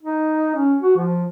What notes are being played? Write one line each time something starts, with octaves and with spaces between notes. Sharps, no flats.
D#4
C#4
F#4
F3